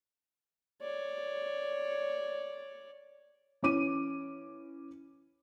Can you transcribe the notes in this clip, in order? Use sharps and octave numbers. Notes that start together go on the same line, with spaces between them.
C#5 D5
E3 C#4 D6 D#7